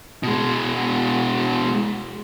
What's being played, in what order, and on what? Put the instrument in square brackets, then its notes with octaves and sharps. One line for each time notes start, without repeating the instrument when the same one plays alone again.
[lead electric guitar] B2 G#3